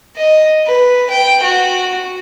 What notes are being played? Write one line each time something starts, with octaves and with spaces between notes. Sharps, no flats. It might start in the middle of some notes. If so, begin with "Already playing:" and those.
D#5
B4
G5
F#4